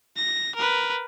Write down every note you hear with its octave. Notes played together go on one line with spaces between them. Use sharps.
A#6
A#4 B4